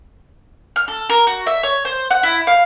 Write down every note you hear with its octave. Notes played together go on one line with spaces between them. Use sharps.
F6
A4
A#4
F#4
E5
C#5
C5
F#5
E4
F5